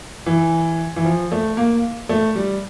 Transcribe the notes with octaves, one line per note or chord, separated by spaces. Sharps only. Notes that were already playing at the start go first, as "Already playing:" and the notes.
E3
E3
F3
A3
A#3
A3
G3